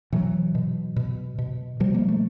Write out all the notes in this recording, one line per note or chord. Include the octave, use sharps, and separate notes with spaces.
B2 E3 F#3
B2
B2
B2
B2 F3 G3
A#3
A3